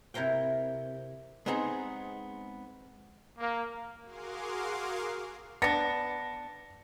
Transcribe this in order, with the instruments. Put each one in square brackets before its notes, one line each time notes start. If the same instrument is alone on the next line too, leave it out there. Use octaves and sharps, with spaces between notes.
[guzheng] C3 E4 A#4 C5 G5
[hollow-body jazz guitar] G#3 B3 C4 D#4 G#4
[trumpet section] A#3
[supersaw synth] F#4 G#4 A#4 F5 C6 D6
[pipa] B3 D4 [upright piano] A6 A#6 C#7